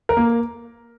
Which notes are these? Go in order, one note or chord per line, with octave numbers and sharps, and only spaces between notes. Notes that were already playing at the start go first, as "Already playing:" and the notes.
A#4
A#3